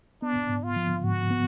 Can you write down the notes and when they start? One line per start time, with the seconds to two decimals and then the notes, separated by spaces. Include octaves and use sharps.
0.22 B3 D4
0.49 G#2
0.63 F4
0.76 F3
1.04 G#2 F#4
1.31 B3